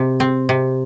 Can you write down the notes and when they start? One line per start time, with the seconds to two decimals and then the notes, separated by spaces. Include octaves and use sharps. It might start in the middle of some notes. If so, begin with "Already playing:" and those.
Already playing: C3
0.20 C4
0.49 C3